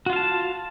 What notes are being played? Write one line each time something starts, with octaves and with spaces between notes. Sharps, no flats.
F4 F#4 F5 A5